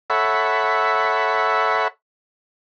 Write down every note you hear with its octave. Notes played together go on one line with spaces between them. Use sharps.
A4 C#5 E5 F#5 B5